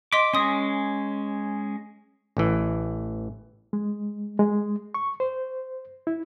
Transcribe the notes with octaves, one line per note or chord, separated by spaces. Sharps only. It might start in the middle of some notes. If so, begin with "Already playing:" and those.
D#5 C6 D6 B6
G#3 C#4 C6 D#6
A1 E3
G#3
G#3
C#6
C5
E4